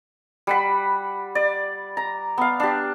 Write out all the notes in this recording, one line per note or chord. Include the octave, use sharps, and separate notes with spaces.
G3 F#5 B5
D5
A#5
B3 F5
D4 G4